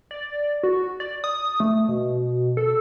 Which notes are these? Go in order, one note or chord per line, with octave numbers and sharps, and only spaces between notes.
D5
F#4
D5
D#6
A3
B2
A4